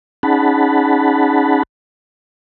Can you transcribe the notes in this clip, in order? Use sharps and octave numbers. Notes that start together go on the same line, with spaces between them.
C#4 D#4 G#4 F#5 A5 B5